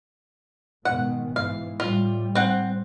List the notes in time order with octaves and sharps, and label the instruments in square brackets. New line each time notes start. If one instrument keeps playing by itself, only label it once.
[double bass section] G#2 B2 D#3 [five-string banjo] F#5
[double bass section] G#2 E3 [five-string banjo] F5
[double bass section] A2 G3 [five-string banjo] F4
[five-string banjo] C4 F#5